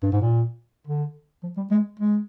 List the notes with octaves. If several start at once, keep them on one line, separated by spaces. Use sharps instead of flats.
G2
G#2
A#2
D3
F3
G3
G#3
G#3